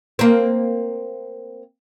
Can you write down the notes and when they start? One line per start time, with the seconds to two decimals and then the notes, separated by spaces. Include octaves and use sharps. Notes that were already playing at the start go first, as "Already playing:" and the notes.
0.19 A#3 C4